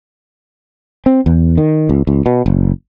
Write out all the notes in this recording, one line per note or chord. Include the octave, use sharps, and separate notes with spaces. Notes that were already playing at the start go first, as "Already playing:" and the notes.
C4
E2
D#3
C#2
C#2
B2
F#1